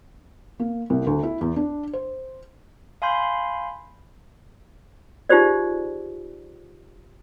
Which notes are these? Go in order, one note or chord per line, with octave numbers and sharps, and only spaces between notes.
A#3
C2
D2
E4
E2
D4
C5
F5 G#5 B5 C6 G6
D#4 F4 G4 G#4 C5 D5